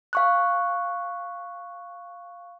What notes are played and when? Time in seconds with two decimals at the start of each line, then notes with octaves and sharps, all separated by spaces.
0.13 F5 C#6 F#6